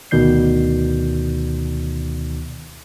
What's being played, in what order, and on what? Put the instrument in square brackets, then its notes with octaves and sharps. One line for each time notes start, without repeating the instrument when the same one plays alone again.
[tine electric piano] D2 B2 D#3 D5 G6 C7